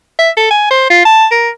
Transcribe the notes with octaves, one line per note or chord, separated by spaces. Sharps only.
E5
A4
G#5
C5
F4
A5
A#4